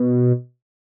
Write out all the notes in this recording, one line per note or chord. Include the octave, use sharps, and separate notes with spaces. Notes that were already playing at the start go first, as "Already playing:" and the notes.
Already playing: B2